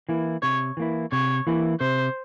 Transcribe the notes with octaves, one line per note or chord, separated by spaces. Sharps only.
E3 A#3 E4
C3 C#5
E3 A#3 E4
C3 C#5
E3 A#3 E4
C3 C5